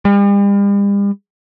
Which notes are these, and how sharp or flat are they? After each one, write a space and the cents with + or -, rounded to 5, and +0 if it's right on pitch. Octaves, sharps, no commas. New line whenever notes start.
G3 +45